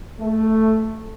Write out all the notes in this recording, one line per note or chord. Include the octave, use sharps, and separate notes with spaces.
A3